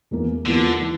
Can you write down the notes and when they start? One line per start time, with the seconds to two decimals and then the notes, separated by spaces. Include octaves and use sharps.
0.11 E2 E3 A#3
0.46 E2 D3 E3 A#3 F4
0.82 E3